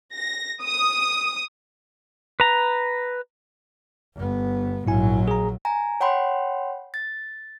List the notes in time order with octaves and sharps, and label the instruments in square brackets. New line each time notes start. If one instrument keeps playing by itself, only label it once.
[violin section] A#6
D#6
[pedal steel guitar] B4 A#5
[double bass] G1 B3
[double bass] A#1 F#3 [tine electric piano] G#2 E4 G#5
[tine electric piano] G#4 A#5
[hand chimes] G#5 A#5
C#5 F#5 G5 B5 C6
A6